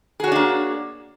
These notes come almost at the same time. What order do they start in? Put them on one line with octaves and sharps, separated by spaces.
G#4 F#4 C#5 D4 A#3